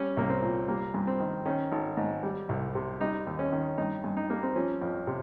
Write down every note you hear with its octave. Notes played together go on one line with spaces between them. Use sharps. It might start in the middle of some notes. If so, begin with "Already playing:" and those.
Already playing: G3 C#4
C2 A#3
C4
A#2
G3 A#3
G2
C4
D#3
D#3 C#4
G#1
G#2
G3
C2
C3
G3 D#4
D#2
C#4
D#3
G2 D#4
G2
D#4
G3 A#3
C4
F3 C#4
F2
C3